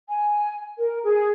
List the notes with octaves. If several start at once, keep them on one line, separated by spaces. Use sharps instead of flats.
G#5
A#4
G#4